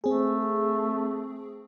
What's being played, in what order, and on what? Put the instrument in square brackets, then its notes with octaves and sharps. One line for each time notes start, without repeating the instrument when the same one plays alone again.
[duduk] A3 [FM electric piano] C4 G#4